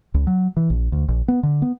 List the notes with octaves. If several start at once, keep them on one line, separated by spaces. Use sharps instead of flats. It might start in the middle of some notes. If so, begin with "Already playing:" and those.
C#2
F#3
E3
A#1
D2
A#1
B3
D3
B3